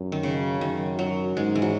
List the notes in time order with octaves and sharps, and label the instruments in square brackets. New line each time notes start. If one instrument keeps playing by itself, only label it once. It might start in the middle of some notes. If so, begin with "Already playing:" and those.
Already playing: [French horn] F#2
[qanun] D#3
C#3
[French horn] F#2 [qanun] D#3
[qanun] F#3
[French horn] G#2 [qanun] G#3
[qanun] E3
F#3